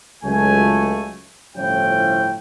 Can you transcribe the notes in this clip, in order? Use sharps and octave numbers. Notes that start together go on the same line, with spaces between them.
C#2 F#3 A3 G#5
G1 A2 F3 C#4 E4 G5